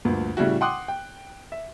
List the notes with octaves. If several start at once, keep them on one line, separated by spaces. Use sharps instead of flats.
D2 G2 A#2
A2 C#3 G3 E4 F#4
F#5 G5 C6 D6 D#6 F#6
G5
E5